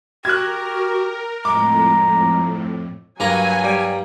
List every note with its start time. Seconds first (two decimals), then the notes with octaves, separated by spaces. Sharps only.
0.25 F#4 G4 A#4 F#6 G#6
1.45 F2 A2 G#3 A#5 D6
3.20 G2 F#3 A#3 G#5 A#5
3.64 G3